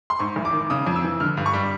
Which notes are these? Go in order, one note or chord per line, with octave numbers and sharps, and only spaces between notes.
C6
G#2 C#6
A1
D6
D#3
C#3 D#6
F2
E6
E3
D3 F6
G2
C#6
G3